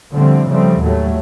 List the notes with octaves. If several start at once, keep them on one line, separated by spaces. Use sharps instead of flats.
D3 F3 G3 A3 C4
C#3 F3 G3 A3 C4
D#2 A2 F#3 G3 A3